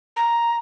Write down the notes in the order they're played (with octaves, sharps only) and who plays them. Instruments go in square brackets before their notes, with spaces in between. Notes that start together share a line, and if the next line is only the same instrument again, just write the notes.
[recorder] A#5